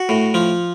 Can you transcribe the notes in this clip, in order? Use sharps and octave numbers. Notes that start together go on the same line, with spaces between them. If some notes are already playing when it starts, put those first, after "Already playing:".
Already playing: F#4
A2
F3